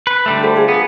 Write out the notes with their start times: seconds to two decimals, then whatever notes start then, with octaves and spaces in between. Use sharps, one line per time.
0.07 B4
0.26 D3 G3 A3
0.43 F#4 A4 C5
0.56 F4 G#4 A#4
0.68 B3